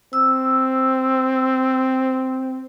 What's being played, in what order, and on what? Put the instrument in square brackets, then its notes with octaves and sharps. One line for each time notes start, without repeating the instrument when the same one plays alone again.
[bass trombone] C4 [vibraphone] E6